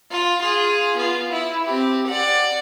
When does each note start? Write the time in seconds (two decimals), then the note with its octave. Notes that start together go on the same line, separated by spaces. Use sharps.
0.11 F4
0.41 F4 G#4
0.96 B3 F4
1.32 E4
1.66 C4 G4
2.07 D5 F#5